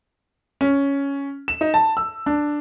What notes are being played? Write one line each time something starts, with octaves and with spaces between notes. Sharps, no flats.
C#4
E7
D#4
A5
E6
D4